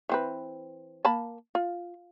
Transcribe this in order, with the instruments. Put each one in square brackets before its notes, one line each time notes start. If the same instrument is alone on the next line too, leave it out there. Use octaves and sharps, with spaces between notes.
[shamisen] E3 C4 B4
A#3 A5 B5
F4